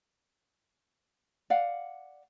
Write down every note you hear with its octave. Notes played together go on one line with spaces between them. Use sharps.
D5 F5 F#5